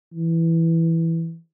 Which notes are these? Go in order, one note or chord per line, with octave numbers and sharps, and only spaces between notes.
E3